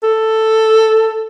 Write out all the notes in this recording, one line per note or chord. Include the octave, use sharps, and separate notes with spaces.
A4